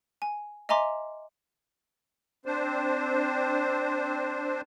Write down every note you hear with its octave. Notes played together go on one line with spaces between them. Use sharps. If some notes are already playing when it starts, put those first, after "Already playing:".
G#5
D#5 E5 G#5 A#5 C6 D6
C4 D4 C5